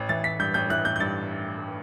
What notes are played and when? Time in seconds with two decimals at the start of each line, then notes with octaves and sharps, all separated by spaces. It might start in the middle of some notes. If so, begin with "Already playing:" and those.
Already playing: A1
0.09 E3 A6
0.24 A1 B6
0.39 G2 G6
0.54 A1 G6
0.70 E3 F#6
0.85 A1 G6
0.96 G6
1.00 G2 A6